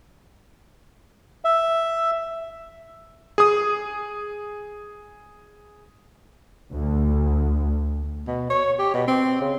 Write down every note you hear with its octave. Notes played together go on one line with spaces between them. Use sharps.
E5
G#4 D#6
D2
B2
C#5
G4
B2
C4
C#3